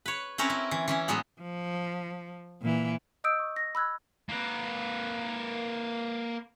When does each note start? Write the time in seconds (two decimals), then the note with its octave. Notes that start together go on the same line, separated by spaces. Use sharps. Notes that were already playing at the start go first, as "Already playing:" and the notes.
0.06 B4 C#5
0.38 C4 C#4 E4 A#4 B4 C#5
0.50 E4
0.71 E3
0.88 E3 C#4 E4
1.08 A2 F#3 G#3 B3
1.41 F3
2.62 A#2 E3
3.24 D#5 D#6 E6 G6 D7
3.39 C#6
3.56 A#6
3.75 B5 E6 F#6 G#6
4.29 A#3 B4